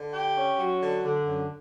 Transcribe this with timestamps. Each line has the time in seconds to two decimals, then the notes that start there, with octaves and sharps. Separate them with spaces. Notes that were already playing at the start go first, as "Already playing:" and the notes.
Already playing: D3
0.14 G4
0.37 C#4
0.59 F#3
0.81 D3
1.05 D3
1.26 F#2